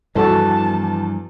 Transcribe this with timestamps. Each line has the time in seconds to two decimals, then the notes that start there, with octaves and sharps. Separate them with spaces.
0.15 E2 G2 F3 F#4 A4 D5 A5